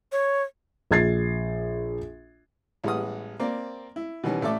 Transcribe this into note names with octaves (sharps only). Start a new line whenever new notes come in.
C#5
A#1 G#4 G#6 A6 C7
A1 G3 G#3 B3 F#5 D#6
A#3 C4 D5
E4
B2 D#3 E3 G3 B3 C#4
A1 A3 A4 D5 E5 D6